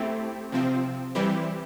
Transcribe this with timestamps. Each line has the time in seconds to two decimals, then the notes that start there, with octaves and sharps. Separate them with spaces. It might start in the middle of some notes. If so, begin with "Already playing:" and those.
Already playing: A3 C4 E4 G4
0.52 C3 F3 C4
1.15 E3 G3 C4 E4 G4